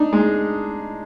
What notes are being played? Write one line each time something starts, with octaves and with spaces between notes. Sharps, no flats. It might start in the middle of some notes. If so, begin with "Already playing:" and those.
Already playing: D4 D#4
G#3